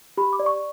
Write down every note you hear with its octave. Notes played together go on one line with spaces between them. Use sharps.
G4 B5
D6
D5
C#6